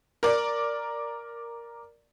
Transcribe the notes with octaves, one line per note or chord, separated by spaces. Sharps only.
A#4 D5